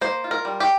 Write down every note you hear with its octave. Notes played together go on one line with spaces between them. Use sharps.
A#3 C5
F4
A#4
G3
G4